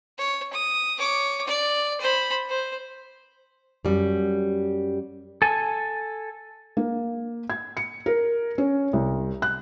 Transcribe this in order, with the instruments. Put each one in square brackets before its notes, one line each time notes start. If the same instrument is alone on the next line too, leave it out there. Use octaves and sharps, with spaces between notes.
[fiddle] C#5
D#6
C#5 D6
D5
C5 B5
C5
[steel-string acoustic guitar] F#2 G3
[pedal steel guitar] A4 G#5
[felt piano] A#3
G#6
C#7
A#4
C#4
C2
F#6